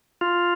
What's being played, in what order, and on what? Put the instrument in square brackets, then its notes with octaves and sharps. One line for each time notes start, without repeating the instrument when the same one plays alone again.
[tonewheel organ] F4